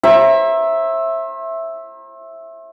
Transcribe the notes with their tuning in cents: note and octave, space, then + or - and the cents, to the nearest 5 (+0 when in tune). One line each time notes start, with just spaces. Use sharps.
C5 +45 E5 +0 A#5 +15